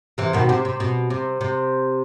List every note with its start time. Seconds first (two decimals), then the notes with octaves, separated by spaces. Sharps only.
0.18 C3 E3
0.33 B2 D#3
0.49 C3
0.65 C3
0.80 B2
1.10 C3
1.41 C3